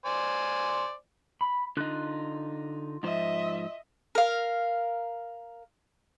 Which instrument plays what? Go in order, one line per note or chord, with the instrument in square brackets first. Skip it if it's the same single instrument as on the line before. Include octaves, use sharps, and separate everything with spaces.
[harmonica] C5 D5 G#5
[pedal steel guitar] B5
[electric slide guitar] D3 D#4 [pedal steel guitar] F4 F#6
[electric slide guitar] G#2 F3 C5 [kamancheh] D#5 E5
[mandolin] A#4 F5